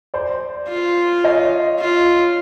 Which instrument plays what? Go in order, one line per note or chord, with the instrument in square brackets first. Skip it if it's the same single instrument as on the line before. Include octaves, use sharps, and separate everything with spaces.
[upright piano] C5 D5
[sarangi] F4
[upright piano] C#5 D#5
[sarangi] F4